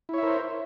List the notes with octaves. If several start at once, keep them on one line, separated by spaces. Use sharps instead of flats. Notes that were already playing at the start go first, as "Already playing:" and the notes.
E4 A#4 C5 C#5 E5